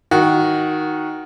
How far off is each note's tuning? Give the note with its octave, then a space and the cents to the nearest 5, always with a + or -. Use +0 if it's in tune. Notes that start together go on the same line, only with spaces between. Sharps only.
D#3 +5 F#4 +0